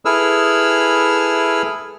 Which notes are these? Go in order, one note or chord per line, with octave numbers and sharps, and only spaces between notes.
E4 G#4 A4 B4 E6 F6